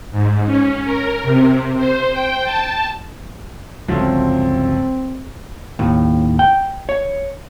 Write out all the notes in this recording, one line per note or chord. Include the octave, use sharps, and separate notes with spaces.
G#2
C#4
A#4
C3
C5
G5
A5
G1 C#2 F3 F#3 A3 C4
D#2 A2
G5
C#5